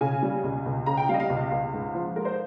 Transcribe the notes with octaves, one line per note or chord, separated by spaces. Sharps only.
C#3 G#5
G3
C#2
C#2
C#3 A#5
G5
G3 F5
D#5
F5
C#2
C#2
G#2
F3
G#3 A#4
C5